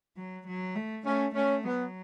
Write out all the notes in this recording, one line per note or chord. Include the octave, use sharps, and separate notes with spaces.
F#3
F#3
A3
A3 C#4
A3 C#4
F#3 B3